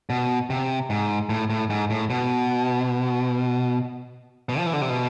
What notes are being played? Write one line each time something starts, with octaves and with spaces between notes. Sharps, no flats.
B2
C3
G#2
A2
A2
G#2
A2
B2
B2
F3
E3
D3
C3
B2